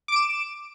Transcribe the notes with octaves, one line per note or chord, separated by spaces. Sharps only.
D6 D7 E7